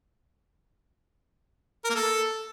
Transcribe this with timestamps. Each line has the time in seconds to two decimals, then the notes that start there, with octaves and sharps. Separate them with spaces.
1.85 A#4
1.90 A#3
1.95 A4